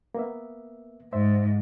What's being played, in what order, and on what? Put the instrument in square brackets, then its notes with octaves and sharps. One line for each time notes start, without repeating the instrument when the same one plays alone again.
[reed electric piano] A#3 B3 E5
[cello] G#2 [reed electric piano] C5 E5